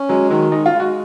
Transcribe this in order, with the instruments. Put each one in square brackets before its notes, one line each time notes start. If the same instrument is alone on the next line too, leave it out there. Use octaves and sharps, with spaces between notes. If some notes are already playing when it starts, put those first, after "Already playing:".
Already playing: [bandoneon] C#4
[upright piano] F#3 [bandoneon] G#3
[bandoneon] D#3 [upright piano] F#3
[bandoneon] G#3 [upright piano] D#4
[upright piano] F4
[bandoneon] G#3
[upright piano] F#4